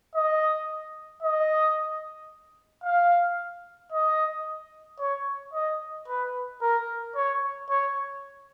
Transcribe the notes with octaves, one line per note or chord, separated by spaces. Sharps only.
D#5
D#5
F5
D#5
C#5
D#5
B4
A#4
C#5
C#5